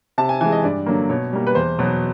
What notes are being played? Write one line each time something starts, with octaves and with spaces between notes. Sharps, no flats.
C3 A5
G#5
E3 G#3 G#5
D#5
G2 D5
D3 F#3 A#3
B2 C#5
G3 A#3
B4
E2 C5
B2 F#3 B3